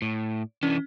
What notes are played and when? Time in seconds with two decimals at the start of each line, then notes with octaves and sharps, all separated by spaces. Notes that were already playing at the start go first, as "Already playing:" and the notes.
0.02 A2
0.63 E3 C#4 D4